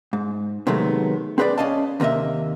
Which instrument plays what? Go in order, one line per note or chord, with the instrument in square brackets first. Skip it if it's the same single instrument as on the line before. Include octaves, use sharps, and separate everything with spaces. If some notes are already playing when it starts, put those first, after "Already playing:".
[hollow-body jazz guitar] G#2
C3 D#3 F#3 G#3 A3 B3
C4 G#4 B4 C5 D5
C#4 D5 D#5 F5 A5
D#2 C3 A#3 D#5 E5